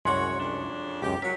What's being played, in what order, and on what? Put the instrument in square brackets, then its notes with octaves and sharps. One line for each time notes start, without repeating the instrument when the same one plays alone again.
[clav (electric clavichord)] C2 F#2 G#3 [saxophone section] F#4 C#5 [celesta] C6 C#6
[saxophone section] F2 C#3 D4
[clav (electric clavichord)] C#2 F#2 [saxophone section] G4
[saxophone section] F#3 [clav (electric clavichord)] A#4 [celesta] B6